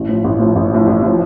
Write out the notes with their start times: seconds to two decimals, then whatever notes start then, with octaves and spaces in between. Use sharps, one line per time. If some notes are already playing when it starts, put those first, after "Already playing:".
Already playing: A1
0.09 A2 F3
0.24 A1
0.40 A2 F3
0.56 A1
0.72 A2 F3
0.87 A1
1.03 A2 F3